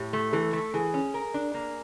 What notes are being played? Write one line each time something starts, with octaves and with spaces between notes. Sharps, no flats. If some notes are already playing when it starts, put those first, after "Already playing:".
Already playing: A2 G4
A3
E3 A4
A3
E3 G#4
C#4
A#4
D4
A#3